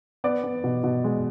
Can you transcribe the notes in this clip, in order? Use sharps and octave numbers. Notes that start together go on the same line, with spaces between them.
B3 D5
B3
B2
B2
G#3